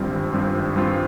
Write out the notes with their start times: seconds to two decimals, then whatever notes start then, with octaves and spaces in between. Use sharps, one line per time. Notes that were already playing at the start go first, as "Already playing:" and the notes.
Already playing: G#1 G2 G3 C4 F4
0.11 G#1
0.33 G2 G3 C4 F4
0.55 G#1
0.76 G2 G3 C4 F4